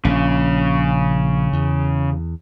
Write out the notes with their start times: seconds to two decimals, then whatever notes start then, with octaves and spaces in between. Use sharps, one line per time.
0.05 A#1 C#3 C#4
1.53 E2